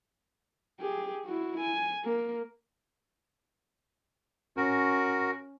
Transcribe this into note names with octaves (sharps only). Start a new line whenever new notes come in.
G4 G#4
E4 F#4
G#5
A#3
C#4 F#4 A#4